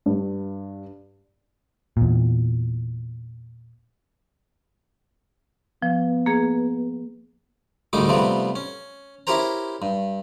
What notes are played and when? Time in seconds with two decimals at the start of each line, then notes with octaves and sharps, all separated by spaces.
0.06 G2
1.97 E2 A#2
5.82 F3 B3
6.26 A#3 G#4
7.93 D2 G#2 D#3 G3 D#4 D6
8.08 C3 F3 G3 A3 B3 C4
8.56 C#4
9.27 C#4 E4 G4 A#4 C5 A#5
9.82 G2